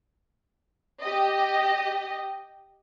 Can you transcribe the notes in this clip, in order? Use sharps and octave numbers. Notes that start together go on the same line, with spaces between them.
G4 D#5